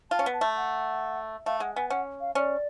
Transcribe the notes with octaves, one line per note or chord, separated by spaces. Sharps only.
F4 A5
C#4
B3
A5
A3
F#5
A3 F5
G#3 F#5
B3 G#5
C#4 F#5
F5
C#4 D5